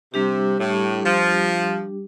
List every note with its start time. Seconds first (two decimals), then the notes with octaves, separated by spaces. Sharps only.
0.14 C3 G3 D4 G4
0.59 A2
1.05 F3